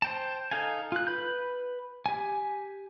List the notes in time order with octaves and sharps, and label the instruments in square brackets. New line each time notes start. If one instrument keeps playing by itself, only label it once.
[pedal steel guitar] C5 G5 A5
D#4 A4 F5 G#5
F4 F#6
B4 B5 G6
G4 G#5